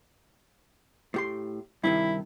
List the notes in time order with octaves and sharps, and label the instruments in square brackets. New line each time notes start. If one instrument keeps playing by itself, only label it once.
[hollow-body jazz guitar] A2 G4 C6
[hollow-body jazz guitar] G2 C3 D#3 [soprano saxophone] E4